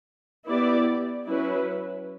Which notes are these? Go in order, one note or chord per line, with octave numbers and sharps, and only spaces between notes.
B3 E4 G4 D5
F#3 C#4 E4 B4